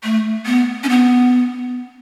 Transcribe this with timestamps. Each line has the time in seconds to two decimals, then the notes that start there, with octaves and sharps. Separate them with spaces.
0.03 A3
0.46 B3
0.83 C#4
0.89 B3